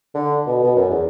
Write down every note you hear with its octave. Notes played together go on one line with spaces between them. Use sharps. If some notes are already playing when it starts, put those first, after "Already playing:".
D3
B2
B2
F#2
E2